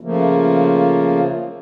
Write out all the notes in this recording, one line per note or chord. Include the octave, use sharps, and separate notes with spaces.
C#3 F3 A3 A#3